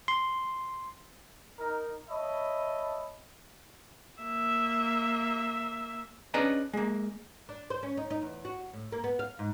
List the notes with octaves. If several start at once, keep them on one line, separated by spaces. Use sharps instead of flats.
C6
D#4 A#4
C#5 D#5 E5 A5 B5
A#3 E5
C#4 D4 G#4 B4 D#5 A#5
G#3 A#3
D4
C5
C#4
D#4
D#4
E2
F#4
A2
A#3
B3
F5
G#2